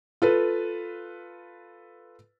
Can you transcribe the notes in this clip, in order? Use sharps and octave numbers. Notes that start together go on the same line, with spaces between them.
F4 A4 B4